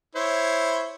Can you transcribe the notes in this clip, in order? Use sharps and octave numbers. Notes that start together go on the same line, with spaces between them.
E4 C5 C#5